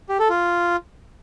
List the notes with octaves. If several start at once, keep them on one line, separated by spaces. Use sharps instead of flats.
G4
A4
F4